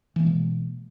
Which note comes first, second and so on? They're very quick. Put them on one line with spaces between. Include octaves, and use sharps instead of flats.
E3 A#3 G#3 B2